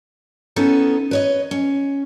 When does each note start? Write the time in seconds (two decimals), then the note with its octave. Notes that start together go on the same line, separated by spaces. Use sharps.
0.56 B3 C#4 D#4 E4 A4
1.11 B4 C#5 D#5
1.51 C#4